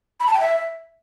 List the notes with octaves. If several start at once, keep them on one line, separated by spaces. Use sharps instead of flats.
B5
A5
G5
E5